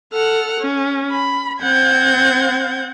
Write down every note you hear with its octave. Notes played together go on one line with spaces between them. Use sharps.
A4 F#5 F6
C#4
B5
C4 F#5 G6 G#6